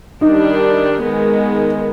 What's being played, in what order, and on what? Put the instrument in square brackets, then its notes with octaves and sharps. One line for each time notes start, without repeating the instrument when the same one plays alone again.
[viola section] D#3 G3 D4 [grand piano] D#4
[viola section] D#3 G#3 B3